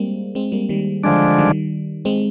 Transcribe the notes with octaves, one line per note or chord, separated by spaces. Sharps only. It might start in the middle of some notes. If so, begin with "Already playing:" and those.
Already playing: G3 G#3 A#3 C4
G#3 C4
G3 A#3
D#3 G3
D3 F3 G#3 D4
D#3 G3
G#3 C4